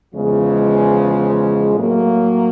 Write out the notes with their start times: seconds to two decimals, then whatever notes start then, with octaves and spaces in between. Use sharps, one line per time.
0.15 E2 C#3 F3 G#3
1.76 A2 F#3 A#3